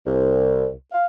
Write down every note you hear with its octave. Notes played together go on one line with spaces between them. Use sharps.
C2
F5